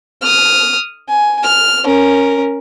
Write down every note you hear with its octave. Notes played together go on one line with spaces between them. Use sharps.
D#6 F6
G#5
F6
C#4 A#4